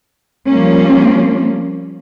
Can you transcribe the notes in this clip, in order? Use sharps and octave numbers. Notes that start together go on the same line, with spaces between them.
F3 G3 A#3 C#4